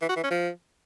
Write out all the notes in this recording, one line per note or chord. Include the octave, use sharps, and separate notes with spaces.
E3
F#4
E3
C#4
F3